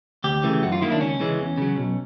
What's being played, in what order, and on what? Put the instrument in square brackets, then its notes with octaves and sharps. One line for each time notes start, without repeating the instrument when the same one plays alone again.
[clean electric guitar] D2 G4
C#3 E3 A3
F#2 F#4
F4
D#3 F#3 A#3 E4
D4
C#2 C#4
C#3 E3 G#3
E2
C#3 F#3
B1